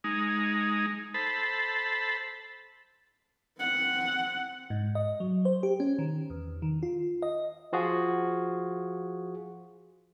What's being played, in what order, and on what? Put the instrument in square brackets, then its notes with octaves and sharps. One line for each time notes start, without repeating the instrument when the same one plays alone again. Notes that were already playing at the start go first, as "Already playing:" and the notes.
[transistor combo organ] G#3 D#4
A4 C5 A5 B5
[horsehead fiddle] C4 F#5
[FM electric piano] G#2
D#5
F#3
C5
G4
C#4
D#3
E2
D#3
F4
D#5
[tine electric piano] F3 F4 F#4 G#4